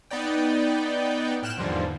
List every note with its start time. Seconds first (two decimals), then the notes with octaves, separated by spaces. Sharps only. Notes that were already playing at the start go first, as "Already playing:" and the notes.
0.11 B3 D#4 D5 G5
1.43 A2 G5 F6 F#6 E7
1.57 E2 G#2 D3 F3 G3 A#3